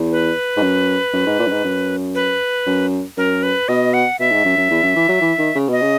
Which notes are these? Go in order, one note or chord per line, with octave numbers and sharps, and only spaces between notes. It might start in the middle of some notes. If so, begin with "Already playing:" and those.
Already playing: E2
B4
G#2
F#2
F#2
G#2
A#2
F#2
G#2
F#2
B4
F#2
F#2 A#4
B4
B2 D#5
F#5
B2 E5
G#2
F#2
F#2
E2
F#2
E3
F#3
E3
D#3
C#3
B2 D#5
C#3